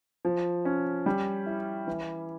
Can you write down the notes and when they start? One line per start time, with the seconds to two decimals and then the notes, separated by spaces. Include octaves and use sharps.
0.25 F3
0.65 C#4
1.06 G3
1.46 E4
1.87 E3